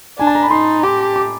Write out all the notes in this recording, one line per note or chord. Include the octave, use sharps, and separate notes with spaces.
D4 G#5
A5
A#5
B5
D#4 C6
G4 D6
D6